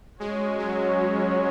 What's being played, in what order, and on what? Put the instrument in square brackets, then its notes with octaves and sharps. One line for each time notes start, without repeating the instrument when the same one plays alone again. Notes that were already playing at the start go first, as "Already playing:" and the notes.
[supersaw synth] G#3 [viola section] C#4 F#4 C#5
[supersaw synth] F#3